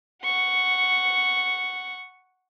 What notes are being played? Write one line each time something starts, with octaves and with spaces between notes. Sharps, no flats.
F#5 C#6